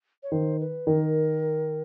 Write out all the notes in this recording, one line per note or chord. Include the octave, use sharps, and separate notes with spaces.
C#5
D#3 C5
B4
D#3 A#4